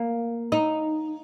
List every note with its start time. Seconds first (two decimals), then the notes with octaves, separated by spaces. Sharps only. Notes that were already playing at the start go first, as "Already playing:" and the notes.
Already playing: A#3
0.52 D#4